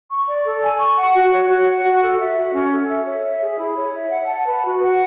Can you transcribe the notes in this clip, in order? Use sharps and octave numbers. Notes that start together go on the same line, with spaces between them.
C#6
D5
A4
G#5
C#6
F#5
F#4
C#5
F#4
F#5
F#4
A4
E5
F#4
C#4
A4
E5
C#5
E5
G#4
E4
C#5
E5
F#5
A5
B4
F#4
F#5